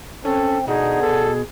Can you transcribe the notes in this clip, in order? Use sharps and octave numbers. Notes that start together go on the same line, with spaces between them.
C4 C#4 A4
B2 D3 D#4 G#4
A4